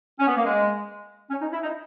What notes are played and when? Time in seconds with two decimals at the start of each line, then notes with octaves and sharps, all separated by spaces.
0.19 C#4
0.27 B3
0.36 A#3
0.45 G#3
1.30 C#4
1.41 D#4
1.52 E4
1.63 D#4